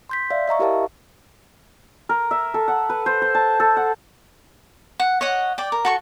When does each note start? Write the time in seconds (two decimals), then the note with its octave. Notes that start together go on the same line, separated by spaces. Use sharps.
0.09 C6 G6 B6
0.30 D5 E5 F5
0.48 D#5 E5 A#5 C#6
0.59 E4 G4 A#4 F5 A5
2.09 A#4
2.31 E5
2.54 A4
2.68 F#5
2.89 B4
3.06 C5
3.22 C5
3.35 A5
3.60 A4
3.77 F#5
5.00 F#5
5.21 C#5 D#5 F#5
5.58 D5 G5
5.72 A#4
5.85 F#4 A4 C#6